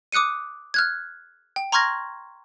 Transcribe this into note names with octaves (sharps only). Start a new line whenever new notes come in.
D6 D#6 F#6 C#7 D#7
F6 F#6 G#6
G5
A#5 C6 C#6 F6 G#6 A#6